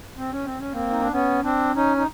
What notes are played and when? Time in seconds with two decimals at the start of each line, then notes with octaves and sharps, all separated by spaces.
0.17 C4
0.32 C#4
0.44 C4
0.59 C#4
0.72 A#3 C4
0.90 D#4
1.01 D4
1.12 B3 C#4
1.43 C4 D4
1.75 C#4 D#4
1.97 D#4